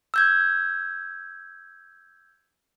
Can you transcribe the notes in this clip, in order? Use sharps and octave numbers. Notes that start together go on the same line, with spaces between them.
E6 G6 G#6